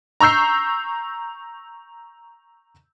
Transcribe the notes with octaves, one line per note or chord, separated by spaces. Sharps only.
A#5 C#6 E6 G6 C7